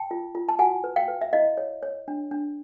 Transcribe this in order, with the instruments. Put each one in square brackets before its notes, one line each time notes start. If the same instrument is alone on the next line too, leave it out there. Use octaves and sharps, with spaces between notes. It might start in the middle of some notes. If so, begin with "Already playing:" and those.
Already playing: [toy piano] G5 A5
F4
F4
A5
F#4 F#5 G#5
B4
F5 G5
B4
E5
E4 D#5 F5
C#5
C#5
D4
D4